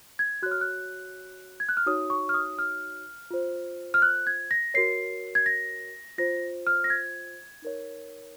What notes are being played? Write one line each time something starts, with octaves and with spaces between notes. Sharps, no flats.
G#6
F#4 C#5 F#6
F6
F#6
G#6
F#6
F6
D#4 F#4 C#5 D#6
C#6
F6
D#6
F6
F4 C5
F6
F#6
G#6
A#6
F#4 A#4 C#5 C7
G#6
A#6
F4 C5 A#6
F6
A#6
G#6
D#4 A#4 C#5